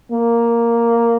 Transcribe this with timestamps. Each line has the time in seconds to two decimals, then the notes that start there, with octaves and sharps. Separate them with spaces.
0.12 A#3